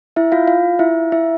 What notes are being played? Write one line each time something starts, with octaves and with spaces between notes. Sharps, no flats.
E4 E5
F4 F5
F4 F5
E4 E5
E4 E5